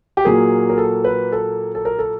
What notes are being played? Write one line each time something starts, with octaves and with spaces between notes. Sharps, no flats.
G4
A#2 F#3 A#3 G#4
A#4
A4
B4
A4
A4
A#4
A4